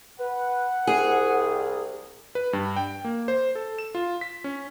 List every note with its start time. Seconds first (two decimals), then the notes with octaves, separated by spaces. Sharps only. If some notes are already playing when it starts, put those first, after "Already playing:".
0.19 B4 F#5
0.87 C2 G#4
2.35 B4
2.53 G2
2.76 G5
3.04 A#3
3.28 C5
3.55 A4
3.78 E7
3.95 F4
4.21 B6
4.44 C#4